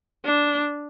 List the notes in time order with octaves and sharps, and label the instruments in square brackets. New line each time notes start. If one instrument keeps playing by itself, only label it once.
[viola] D4